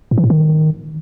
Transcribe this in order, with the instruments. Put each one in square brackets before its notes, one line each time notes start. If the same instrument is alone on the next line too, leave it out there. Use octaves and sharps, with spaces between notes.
[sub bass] A2
E3
A2
D#3